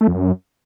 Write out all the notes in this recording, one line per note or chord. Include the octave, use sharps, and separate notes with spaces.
A3
F2
F#2